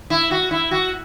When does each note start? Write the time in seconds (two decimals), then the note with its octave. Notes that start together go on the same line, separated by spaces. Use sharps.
0.10 E4
0.31 F#4
0.51 E4
0.71 F#4